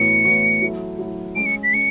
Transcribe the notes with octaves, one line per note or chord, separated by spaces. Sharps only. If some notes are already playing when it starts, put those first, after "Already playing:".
Already playing: A2 E3 B3 F#4 C#5 C#7
A2 E3 B3 F#4 C#5
F#3 A3 E4
F#3 A3 E4
G#3 C#4 G#4 D7
C#7
B6
G#3 C#4 C#7